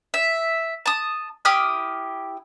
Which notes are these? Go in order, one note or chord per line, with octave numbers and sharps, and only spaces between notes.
E5
A5 D#6
E4 G4 D#6 F6